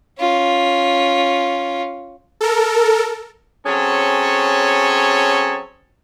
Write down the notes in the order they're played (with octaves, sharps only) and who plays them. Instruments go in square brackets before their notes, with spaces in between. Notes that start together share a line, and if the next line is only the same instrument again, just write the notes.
[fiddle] C#4 F4
[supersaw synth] A4 A#4
[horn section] F#3 C4 C#4 G#4 A4 C#5